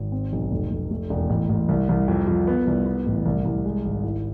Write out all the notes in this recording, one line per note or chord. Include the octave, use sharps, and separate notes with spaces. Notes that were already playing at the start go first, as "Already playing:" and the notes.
Already playing: G#1
C4
B1
F1
F1
A3
E1
A1
A1
C2
C2
F2
F2
B3
C2
B3
A1
C2
C2
G#3
G#1
E4